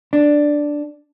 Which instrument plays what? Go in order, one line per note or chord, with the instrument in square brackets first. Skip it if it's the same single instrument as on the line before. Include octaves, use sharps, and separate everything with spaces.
[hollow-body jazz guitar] D4